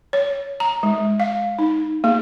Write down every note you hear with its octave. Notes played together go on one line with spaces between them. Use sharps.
C#5
A#5
G#3
F5
D#4
A#3